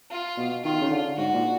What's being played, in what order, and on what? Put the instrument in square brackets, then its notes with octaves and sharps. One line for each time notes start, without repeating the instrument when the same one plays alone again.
[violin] F4
[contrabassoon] B2
[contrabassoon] D#3 [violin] F4
[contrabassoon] C#3
D3
[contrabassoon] G#2 [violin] F#4
[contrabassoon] A#2